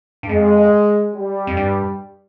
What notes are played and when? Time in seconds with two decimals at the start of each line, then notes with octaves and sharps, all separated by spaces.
0.23 G2
0.29 F2 G#3
1.14 G3
1.47 F2
1.57 G2